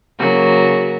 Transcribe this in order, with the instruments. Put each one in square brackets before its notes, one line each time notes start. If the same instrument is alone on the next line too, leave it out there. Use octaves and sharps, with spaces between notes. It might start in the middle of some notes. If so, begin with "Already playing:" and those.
[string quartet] C#3 F#3 A#3 F#4